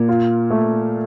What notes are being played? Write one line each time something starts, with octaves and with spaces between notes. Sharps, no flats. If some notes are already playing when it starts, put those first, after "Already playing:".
Already playing: A#2
F4
A3